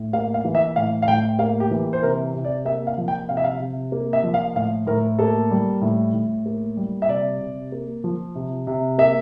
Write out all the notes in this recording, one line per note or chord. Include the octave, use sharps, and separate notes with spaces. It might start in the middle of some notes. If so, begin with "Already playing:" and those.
Already playing: A2
A#3 F5
F5
E3
E5
A2 F5
F5
A2 G5
A#3 F5
G4
E3
C5
C3 A#4
C3
D5
A#3 E5
F5
F3
G5
C3 F5
E5
F5
C3
A#3
E5
F3
F5
A2 F5
A2 A#4
A#3 A4
G3
A2
A2
A#3
G3
E5
C3 D5
C3
A#3
F3
C3
C3
A#3 E5